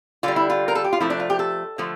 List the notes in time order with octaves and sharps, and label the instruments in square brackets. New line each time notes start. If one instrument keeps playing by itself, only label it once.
[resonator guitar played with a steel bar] D3 G3 F4
E4
F4
A#4
A4
G4
F4
C3 F3 A3 E4
D4
F4
G4
A4
D3 F3 A3